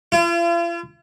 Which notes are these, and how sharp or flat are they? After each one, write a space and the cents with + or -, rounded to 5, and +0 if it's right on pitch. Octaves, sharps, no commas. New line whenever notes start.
F4 -45